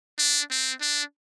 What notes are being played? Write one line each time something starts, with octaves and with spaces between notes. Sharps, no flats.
D4
C4
D4